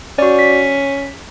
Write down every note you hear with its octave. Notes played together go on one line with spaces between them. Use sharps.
C#4 F#4 D5
B6